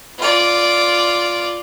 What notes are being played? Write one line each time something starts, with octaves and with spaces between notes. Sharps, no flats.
F4 D5